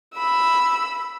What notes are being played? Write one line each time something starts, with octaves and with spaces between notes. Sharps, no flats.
B5 E6